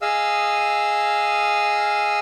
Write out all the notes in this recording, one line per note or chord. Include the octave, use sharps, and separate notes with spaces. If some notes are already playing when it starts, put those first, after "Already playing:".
G#4 D#5 F5 E6